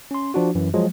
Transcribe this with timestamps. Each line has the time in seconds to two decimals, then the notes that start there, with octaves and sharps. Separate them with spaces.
0.11 C#4 C6
0.34 F3 D4 F#4
0.55 F#2 E3
0.74 F3 F#3 G#3